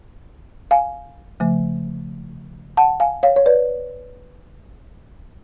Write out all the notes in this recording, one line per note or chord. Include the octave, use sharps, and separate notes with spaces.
F5 G#5
C#3 F3 A3
F#5 A5
F5 G#5
C#5 F5
C#5
B4 D5